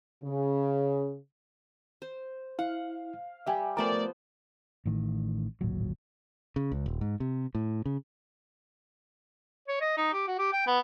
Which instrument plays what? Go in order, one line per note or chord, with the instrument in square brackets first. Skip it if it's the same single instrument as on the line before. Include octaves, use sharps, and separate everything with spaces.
[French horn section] C#3
[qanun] C5
[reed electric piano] E4 [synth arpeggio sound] F5 [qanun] F#5
[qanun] G3 G4 [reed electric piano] E5 G5 G#5
[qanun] F3 B3 C5 [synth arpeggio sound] A3 A#4 [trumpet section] D5
[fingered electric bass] A1 A2 D#3
D1 G#1 A#2 F#3
C#3
C#2
D#1
G#2
C3
A2
C#3
[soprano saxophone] C#5
D#5
D#4
G4
F#4
G4
G5
B3